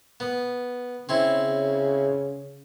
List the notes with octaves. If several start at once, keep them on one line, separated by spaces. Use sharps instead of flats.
B3
C#3 C4 C#4 E4